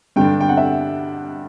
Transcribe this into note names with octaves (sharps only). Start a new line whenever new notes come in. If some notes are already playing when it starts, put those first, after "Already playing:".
G2 D3 G3 D4 G5
G5
F#5
E5